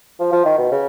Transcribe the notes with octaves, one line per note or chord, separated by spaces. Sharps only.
F3
F3
D#3
B2
C#3